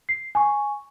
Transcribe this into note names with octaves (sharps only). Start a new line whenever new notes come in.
C7
G#5 C#6